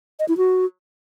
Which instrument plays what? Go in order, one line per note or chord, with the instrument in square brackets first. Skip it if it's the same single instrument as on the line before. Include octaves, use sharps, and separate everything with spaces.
[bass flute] D#5
E4
F#4